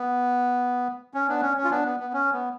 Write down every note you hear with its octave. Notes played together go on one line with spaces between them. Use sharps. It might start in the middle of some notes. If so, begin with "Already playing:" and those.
Already playing: B3
C#4
B3 D4
C#4
C#4
F4
B3 D4
B3
B3
C#4
B3